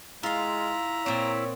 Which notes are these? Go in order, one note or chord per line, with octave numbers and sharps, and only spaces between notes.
G#3 E4 F4 F5 A#5
A#2 C4 C#5